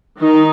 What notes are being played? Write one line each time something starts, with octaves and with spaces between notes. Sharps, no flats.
D#3 D#4